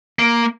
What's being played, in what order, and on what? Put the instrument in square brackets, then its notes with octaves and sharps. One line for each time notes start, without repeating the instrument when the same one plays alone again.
[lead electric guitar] A#3